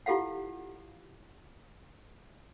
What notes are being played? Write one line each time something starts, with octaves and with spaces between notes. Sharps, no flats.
E4 F4 G4 A4 F5 F#5